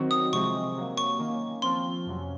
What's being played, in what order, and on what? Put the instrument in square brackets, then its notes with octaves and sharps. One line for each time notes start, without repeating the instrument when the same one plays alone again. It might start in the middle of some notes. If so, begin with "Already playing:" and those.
Already playing: [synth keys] D#3 F#3 C4 F#4
[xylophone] D#6
[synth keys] C3 F3 G#3 C4 [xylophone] C#6
[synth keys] C3 F#3 A#3
[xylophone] C#6
[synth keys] D#3 A#3 C#4
[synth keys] F3 C4 F4 [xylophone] C6
[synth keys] F2 C3 F#3 C#4